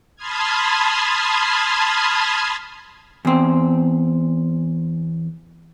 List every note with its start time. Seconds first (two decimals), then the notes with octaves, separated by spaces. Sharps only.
0.16 A5 B5 C6 D#6 F6 G#6
3.25 E2 C4